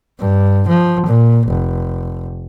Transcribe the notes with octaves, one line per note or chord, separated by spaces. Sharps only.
G2
F3
A#2
F1